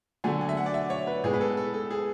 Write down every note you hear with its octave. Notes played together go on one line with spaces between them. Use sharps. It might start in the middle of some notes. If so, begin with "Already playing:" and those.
D3 F#3 A3 G#5
G#5
E5
F#5
D5
E5
C#5
B4
A2 G#3 B3 G#4
B4
A4
A4
A4
G#4